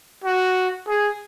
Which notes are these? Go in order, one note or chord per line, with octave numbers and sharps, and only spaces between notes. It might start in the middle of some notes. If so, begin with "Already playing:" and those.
F#4
G#4